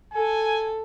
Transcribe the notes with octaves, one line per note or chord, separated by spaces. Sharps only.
A4 G#5